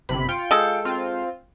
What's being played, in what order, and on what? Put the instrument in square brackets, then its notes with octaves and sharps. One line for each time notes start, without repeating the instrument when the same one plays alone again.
[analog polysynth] G1 C3 B5
F4 G5 C#7
[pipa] G#3 A4
[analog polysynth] C4 F4